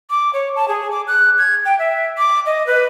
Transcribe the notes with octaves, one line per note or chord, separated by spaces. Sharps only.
D6
C#5
A5
G#4
D6
F#6
G#6
G5
E5
D6
D#5
B4